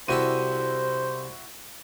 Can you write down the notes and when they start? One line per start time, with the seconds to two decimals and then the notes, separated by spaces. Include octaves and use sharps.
0.08 C2 E4 F#4 G4 A4 C5 D#7